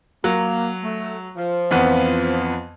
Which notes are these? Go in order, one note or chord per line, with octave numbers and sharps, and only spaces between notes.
F#3 A#3
A3
F3
F2 E3 B3